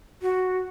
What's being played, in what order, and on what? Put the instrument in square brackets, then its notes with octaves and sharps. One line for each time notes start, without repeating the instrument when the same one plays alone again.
[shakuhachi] F#4